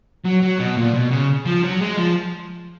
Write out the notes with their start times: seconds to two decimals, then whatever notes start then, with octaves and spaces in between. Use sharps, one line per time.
0.25 F#3
0.42 F#3
0.59 B2
0.77 A#2
0.94 B2
1.11 C#3
1.46 F3
1.63 F#3
1.81 G#3
1.97 F3